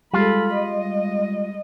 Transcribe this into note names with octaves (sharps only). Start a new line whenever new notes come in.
G3 G#3 F4 A4 B5
D#5